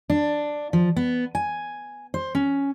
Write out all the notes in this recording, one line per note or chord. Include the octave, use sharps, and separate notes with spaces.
D4
F3
B3
G#5
C5
C#4